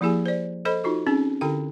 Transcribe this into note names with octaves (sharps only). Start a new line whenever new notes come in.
F3 A#3 E4 G4 G#4 G#5
C5 D5
A4 C5 D#5 B5
D#4 F4 F#4 A4
C4 C#4 D#4 G#4
D3 E4 G4 A4 G5